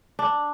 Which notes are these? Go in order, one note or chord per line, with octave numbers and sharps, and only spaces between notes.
D4